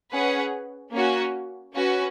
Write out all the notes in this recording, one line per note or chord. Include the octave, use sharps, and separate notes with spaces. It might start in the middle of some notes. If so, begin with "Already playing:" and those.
C#4 G#4 B4 F#5
A#3 C#4 F#4
C#4 F#4 B4